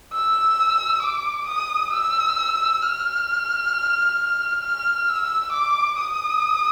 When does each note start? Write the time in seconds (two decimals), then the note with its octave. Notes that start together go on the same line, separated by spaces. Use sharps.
0.13 E6
1.02 D6
1.47 D#6
1.93 E6
2.83 F6
4.63 F6
5.08 E6
5.53 D6
5.98 D#6